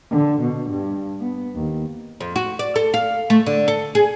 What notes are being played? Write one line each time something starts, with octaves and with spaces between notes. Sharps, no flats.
D3
B2
G2
B3
D#2
F2
F#4
D5
A4
F5
A3
D3
A4
G#4